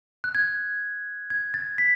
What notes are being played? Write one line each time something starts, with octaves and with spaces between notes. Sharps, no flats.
F#6
G#6
G#6
A6
B6